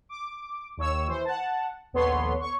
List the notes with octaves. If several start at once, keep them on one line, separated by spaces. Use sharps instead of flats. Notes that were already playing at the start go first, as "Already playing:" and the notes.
D6
D#2 C#5 E6
E3 C5
F#5 A5
A#1 D#2 B3 A4 C#5 C6
C#5 C#6